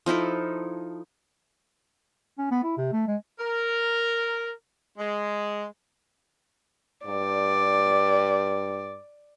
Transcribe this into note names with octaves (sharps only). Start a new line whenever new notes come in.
F3 D#4 E4 A4
C#4
B3
E4
C3
A3
G#3
A#4
G#3
G2 D5